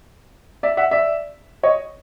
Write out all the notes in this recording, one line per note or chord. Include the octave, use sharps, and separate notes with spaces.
D5 E5
E5 F#5
D5 E5
C#5 D#5